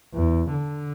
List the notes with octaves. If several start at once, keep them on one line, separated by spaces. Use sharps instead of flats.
E2
D3